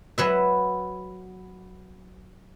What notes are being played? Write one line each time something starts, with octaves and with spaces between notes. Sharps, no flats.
F#3 B4 E5